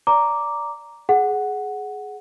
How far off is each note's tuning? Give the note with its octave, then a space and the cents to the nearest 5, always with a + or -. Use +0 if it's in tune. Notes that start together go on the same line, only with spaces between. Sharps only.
D5 -20 A#5 +0 D6 -5
G#4 +15 F#5 +0